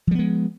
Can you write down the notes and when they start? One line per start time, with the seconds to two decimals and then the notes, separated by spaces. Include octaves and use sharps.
0.07 F3
0.11 G3
0.15 B3
0.19 G#3